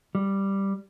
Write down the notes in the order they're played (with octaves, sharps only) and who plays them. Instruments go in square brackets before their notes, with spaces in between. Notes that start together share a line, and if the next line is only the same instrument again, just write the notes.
[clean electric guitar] G3